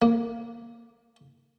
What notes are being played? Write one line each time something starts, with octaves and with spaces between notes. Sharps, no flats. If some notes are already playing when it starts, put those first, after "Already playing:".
A#3